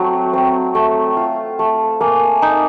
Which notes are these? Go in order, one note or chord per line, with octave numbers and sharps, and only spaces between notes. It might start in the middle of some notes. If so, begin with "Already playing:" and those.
Already playing: F#3 A3 C4
C4
A3
F4
A3
A#3 G#5
D#4